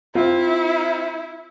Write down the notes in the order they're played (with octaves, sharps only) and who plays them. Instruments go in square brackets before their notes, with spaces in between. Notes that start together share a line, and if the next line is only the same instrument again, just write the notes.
[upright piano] C4 F4 [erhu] E4